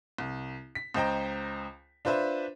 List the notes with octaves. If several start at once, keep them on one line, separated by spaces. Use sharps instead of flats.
C2
B6
C#2 C5 D#5 G5 A#5
D4 F4 B4 C5 E5